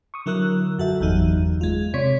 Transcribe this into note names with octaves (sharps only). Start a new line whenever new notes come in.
C#6 D#6
D3 F#3 E4 A#4 E6 F#6
F#2 F#4 A4 E5
G1 E2 F#3 D#4
G#3 F4
C3 C#5 D5 G#6 B6